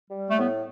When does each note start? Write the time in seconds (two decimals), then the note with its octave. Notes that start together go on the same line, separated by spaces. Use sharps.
0.11 G3
0.30 A3
0.38 A2 B3